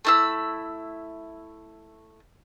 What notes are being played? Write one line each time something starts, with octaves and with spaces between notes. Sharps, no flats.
A3 E4 E6